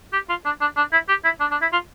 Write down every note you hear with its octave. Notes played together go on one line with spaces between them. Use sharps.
G4
F4
D4
D4
D4
E4
G4
E4
D4
D4
E4
F4